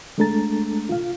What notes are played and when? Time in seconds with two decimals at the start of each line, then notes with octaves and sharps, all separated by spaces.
0.18 G#3 A3 D4 A4 A#5 A6
0.89 F4 F5